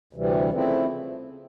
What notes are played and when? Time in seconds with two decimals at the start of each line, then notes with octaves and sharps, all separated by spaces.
0.13 D2 C3 E3 G3
0.49 C#3 F3 A3 C4 E4